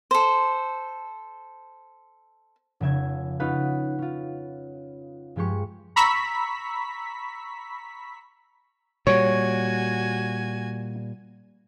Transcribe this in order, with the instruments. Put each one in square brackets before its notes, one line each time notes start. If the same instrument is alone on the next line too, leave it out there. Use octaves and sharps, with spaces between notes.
[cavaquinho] A4 C5
[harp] F1 C#3 E5 G#6
C#4 D#4 F4 B4 F5 F#5
C#4 F4
G2 F3 G#3 G4 C#6
[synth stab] A#5 B5 C#6 E6 B6
[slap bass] A#2 G3 [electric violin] F#4 G#5 [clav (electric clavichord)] C#5